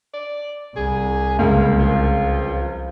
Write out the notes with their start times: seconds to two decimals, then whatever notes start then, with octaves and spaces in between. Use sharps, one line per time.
0.14 D5
0.76 C2 G#4
1.39 C#2 A#3
1.80 F3